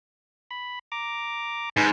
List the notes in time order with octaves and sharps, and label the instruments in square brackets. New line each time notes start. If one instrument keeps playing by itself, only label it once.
[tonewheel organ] B5
A#5 D6
[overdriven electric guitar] G#2 [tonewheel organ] B4